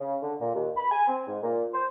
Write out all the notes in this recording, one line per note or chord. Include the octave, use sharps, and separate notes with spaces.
C#3
D3
A#2
D#2
B5
G#5
C4
G#2
A#2
C5